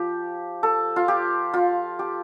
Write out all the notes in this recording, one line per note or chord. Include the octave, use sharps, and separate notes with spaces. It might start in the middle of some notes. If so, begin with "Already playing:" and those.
Already playing: F3 G4
A4
F4
G4
F4
G4